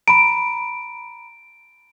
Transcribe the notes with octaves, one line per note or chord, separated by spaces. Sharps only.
A#5 B5 D7